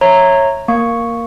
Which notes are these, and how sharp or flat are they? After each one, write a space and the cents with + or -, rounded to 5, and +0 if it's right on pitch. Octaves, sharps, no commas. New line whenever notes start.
C#5 -15 E5 +0 A#5 -10
A#3 +0 C#6 +0